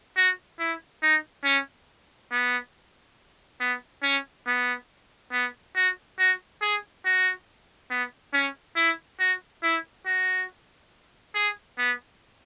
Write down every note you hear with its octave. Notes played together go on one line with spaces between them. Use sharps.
F#4
E4
D#4
C#4
B3
B3
C#4
B3
B3
F#4
F#4
G#4
F#4
B3
C#4
E4
F#4
E4
F#4
G#4
B3